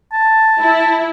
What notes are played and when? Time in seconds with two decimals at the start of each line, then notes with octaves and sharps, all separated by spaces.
0.13 A5
0.58 E4